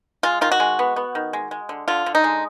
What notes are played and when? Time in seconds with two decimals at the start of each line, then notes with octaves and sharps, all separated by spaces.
0.23 G#3 F4
0.41 D#3 F4
0.52 F#4
0.60 G#3
0.79 B3
0.96 B3
1.15 D#3
1.33 G#3
1.51 G#3
1.69 D3
1.88 D3 F4
2.06 D3
2.15 D#4
2.24 G#3